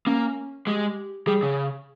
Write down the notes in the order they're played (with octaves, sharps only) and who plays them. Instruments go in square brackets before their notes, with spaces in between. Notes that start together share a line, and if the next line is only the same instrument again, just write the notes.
[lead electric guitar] A#3 [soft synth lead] C#4
[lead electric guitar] G#3 [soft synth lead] G4
[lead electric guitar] G3 [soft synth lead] G#4
[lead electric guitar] C#3